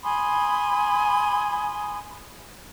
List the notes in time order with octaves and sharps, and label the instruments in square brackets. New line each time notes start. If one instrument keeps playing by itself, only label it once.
[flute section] G#5 B5 C6 D#6